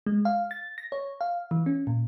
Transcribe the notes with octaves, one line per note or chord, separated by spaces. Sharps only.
G#3
F5
A6
A#6
C#5
F5
E3
C#4
A#2